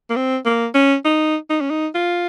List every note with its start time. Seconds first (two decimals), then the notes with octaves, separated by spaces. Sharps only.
0.10 A#3
0.16 C4
0.46 A#3
0.75 C#4
1.05 D#4
1.50 D#4
1.61 C#4
1.70 D#4
1.95 F4